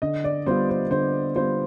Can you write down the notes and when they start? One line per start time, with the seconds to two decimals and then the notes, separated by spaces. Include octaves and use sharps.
0.02 D3 D#5
0.24 D5
0.46 G3 B3 F4 C5
0.69 C5
0.90 D3 C5
1.35 G3 B3 F4 C5